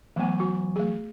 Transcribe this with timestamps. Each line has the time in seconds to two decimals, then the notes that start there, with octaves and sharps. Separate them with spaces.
0.16 E3 F#3 A3 B3 G#5
0.40 F#4
0.76 A3 G#4